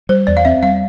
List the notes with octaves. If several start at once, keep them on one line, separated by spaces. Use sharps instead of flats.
G3 C5
E2 D5
F5
C4 E5
G3 F5